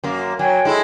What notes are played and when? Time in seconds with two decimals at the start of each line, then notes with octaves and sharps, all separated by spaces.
0.04 F#2 A#3
0.39 F#3 C#5 G5 G#5
0.65 G#3 E4 A4